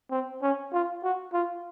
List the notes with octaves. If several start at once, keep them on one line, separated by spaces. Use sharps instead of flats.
C4
C#4
F4
F#4
F4